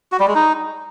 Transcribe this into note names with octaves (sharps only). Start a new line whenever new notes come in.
F#4
G3
G#3
D#4